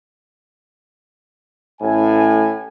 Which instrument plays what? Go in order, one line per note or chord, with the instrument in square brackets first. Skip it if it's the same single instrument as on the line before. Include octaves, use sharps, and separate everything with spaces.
[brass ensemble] A1 A2 G#5